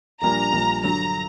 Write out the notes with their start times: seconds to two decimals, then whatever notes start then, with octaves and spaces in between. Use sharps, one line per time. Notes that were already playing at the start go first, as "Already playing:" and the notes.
0.22 A#1 A#2 G3 A#3 D4 A#5
0.53 A#1 A#2 G3 A#3 D4
0.83 G2 D3 F#3 A#5